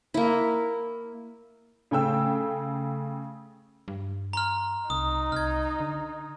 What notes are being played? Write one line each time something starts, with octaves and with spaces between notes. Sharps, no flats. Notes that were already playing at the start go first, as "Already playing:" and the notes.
A#3 E4
C#3 A3 G5 E6
G2
A#5 C6 F6
C2 D#4 D#6
C2 F6 G#6
D3